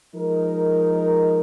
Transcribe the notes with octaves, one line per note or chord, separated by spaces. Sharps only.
F3 G#3 D#4 A#4